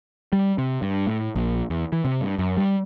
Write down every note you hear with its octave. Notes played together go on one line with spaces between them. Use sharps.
G3
C3
G2
A2
A#1
E2
E3
C3
G2
F#2
G3